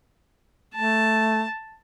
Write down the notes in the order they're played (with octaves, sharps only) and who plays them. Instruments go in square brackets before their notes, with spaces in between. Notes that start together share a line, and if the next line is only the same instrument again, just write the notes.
[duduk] A3 [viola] A5